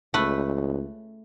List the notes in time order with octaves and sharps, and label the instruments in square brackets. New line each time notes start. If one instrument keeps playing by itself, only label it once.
[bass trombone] C#2 [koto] A3 B4